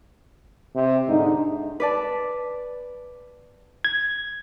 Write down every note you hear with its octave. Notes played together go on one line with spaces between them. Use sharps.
C3
G#2 D3 D#4
B4 D5 A5
G#6